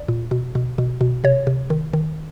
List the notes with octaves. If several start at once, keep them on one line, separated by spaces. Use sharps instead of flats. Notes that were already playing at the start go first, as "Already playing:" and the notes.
Already playing: D5
A#2
B2
B2
B2
B2
C3 C#5
C3
D#3
D#3